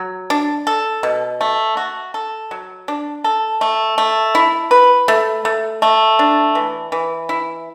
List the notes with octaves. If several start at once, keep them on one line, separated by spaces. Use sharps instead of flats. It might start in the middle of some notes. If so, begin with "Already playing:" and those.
Already playing: F#3
D4
A4
B2
A3
F#4
A4
F#3
D4
A4
A3
A3
E4
B4
A3
A3
A3
D4
E3
E3
E4